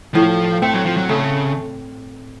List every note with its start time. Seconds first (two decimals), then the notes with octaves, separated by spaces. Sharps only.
0.14 A2 F3
0.62 A3 C4
0.74 F#3
0.86 F3
0.97 F#3
1.09 C#3 A3